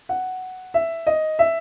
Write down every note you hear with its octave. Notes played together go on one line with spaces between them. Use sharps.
F#5
E5
D#5
E5